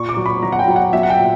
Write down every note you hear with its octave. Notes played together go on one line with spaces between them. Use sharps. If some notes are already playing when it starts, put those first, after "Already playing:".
Already playing: A#2 C#6
D6
F#3
B5
F#3 A#5
F#5
G5
F#3
F#5
F#3 E5
F#5
G5
A#2